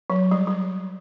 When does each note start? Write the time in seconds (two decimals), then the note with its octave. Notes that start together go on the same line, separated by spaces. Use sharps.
0.10 F#3
0.31 G3
0.47 G3